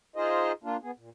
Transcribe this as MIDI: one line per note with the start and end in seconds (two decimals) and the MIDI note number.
0.16 0.52 63
0.16 0.52 65
0.16 0.52 68
0.16 0.52 72
0.16 0.52 75
0.64 0.77 58
0.64 0.77 62
0.64 0.77 65
0.82 0.91 59
0.82 0.91 68
0.97 1.10 46